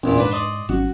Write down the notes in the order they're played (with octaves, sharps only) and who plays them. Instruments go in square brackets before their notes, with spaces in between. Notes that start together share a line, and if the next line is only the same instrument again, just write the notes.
[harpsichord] A#1 E2 A#2 [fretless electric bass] C#4
[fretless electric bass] G#2 [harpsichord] D4 B4
[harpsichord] D5 D#5 C6
[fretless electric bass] G#1 F#3 C#4 [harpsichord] F#4